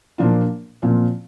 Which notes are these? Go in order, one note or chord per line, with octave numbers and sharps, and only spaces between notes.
A#2 F3 A#3 D4 F4
A#2 F3 C4 F4